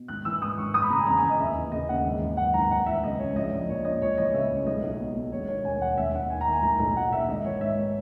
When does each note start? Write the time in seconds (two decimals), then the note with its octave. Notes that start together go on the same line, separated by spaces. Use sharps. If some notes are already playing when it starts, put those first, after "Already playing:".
Already playing: B2
0.08 G#1 F#6
0.25 E3 E6
0.41 G#2 D#6
0.58 G#1 C#6
0.74 F#1 D#6
0.83 B5
0.90 C#3 A#5
0.99 G#5
1.07 E2 A#5
1.18 G#5
1.23 E3
1.29 D#5
1.39 D#2 E5
1.57 E3
1.72 C#3 D#5
1.89 D#2 F#5
2.04 G#1
2.21 E3
2.37 F#2 F#5
2.54 G#1 A#5
2.71 C#2 F#5
2.86 E3 E5
3.04 C#3 D#5
3.19 C#2 C#5
3.35 A#1 D#5
3.52 A#1
3.69 A#2 C#5
3.85 A#2 D#5
4.02 C#2 C#5
4.18 E3 D#5
4.34 C#3 E5
4.51 C#2
4.67 B1 D#5
4.83 B1
5.00 B2
5.15 B2
5.32 E1 C#5
5.48 D#3 C#5
5.65 D#2 G#5
5.81 E1 F#5
5.98 D#2 E5
6.14 D#2 F#5
6.30 D#3 G#5
6.41 A#5
6.47 D#3
6.53 G#5
6.63 B1 A#5
6.80 B1
6.96 A#2 F#5
7.13 A#2 E5
7.28 G#1 D#5
7.45 E3 C#5
7.61 G#2 E5